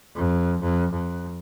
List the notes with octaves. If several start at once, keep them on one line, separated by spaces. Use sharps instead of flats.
F2
F2
F2